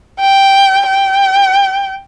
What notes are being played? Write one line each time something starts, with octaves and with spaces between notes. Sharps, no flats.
G5
G5